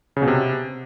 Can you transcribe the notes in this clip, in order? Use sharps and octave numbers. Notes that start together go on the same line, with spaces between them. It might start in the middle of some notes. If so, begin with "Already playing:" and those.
C#3
B2
C3